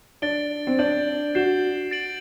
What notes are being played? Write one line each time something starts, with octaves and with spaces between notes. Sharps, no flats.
D4 A6 D7 G7
C4
D4 G6 D7 F#7
F#4 G6 C7 E7 G7
A6 D7 F#7